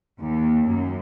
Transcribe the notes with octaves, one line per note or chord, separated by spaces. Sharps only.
D#2
F#2